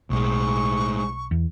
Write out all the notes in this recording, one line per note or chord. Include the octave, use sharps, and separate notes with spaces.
B1 A2 G#3 C#6
E2